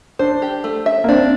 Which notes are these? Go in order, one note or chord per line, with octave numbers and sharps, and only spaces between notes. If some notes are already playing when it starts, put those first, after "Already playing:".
D4 C5
G4
A3
E5
A#3
C4 D4